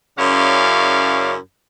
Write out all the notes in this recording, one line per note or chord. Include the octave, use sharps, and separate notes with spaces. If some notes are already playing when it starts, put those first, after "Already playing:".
F#2 C#3 C#4 E4 D5 F5